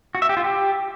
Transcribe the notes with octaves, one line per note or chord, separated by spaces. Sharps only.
F#4
E5
G4
F4
G4